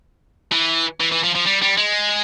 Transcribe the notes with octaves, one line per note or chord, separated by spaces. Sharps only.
E3
E3
E3
F3
F3
G3
G3
G#3